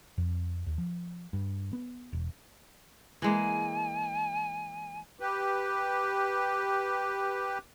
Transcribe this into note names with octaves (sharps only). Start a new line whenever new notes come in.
F2
D#2
F3
G2
B3
E1
E3 G#3 A#3 G#5
G4 B4